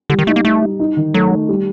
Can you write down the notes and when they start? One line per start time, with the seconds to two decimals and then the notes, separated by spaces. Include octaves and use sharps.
0.10 D3 G3
0.19 D#3
0.27 A3 D#4
0.36 A#3
0.45 A3 D#4
0.62 G3
0.79 D#4
0.97 D#3
1.14 F#3 A3
1.31 A3
1.49 G3